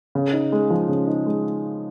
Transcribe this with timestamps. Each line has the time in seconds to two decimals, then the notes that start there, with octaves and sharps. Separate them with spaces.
0.15 C#3
0.33 D#4
0.52 G#3
0.70 F3
0.89 C#3
1.07 D#4
1.26 G#3